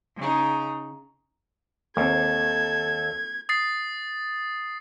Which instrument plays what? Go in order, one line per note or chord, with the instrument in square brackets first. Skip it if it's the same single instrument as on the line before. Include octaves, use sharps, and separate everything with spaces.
[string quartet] C#3 D#4
[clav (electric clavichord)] D#2 [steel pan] A#3 C4 [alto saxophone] A4 [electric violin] G#6
[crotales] D#6 A6 C7